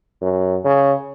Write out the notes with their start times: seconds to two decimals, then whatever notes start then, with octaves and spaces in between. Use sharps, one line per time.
0.22 F#2
0.65 C#3